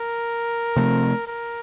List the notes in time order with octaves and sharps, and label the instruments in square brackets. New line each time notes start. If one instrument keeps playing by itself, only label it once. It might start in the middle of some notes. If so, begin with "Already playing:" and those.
Already playing: [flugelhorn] A#4
[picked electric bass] C3 F3 A3 C4
[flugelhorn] A#4